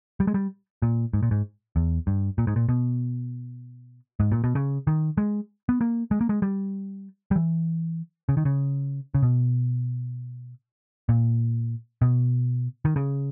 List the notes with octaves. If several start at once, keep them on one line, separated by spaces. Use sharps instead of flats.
G3
G#3
G3
A#2
G#2
A#2
G#2
E2
G2
A#2
G#2
A#2
B2
G#2
A#2
B2
C#3
D#3
G#3
B3
A#3
G#3
A#3
G#3
G3
G3
E3
C#3
D#3
C#3
C#3
B2
A#2
B2
D#3
C#3